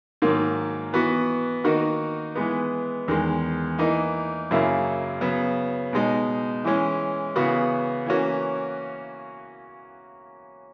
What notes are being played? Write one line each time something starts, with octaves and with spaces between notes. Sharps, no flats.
G#2 D#3 F#3 A#3
E3 B3 F#4
D#3 A#3 D#4 F#4
E3 G#3 B3
E2 D#3 G#3
E3 A#3 D#4
F#2 C#3 F#3 A#3 E4
C#3 F#3 B3
B2 G#3 D#4
E3 G#3 C#4
C#3 E3 B3 F#4
E3 A#3 C#4 F#4